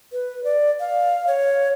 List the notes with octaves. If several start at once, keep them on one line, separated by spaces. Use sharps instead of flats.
B4
D5
F5
C#5